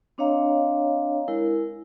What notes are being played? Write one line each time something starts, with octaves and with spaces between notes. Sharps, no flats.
C4 D4 C#5 D#5 F5 A#5
G#3 E4 A#4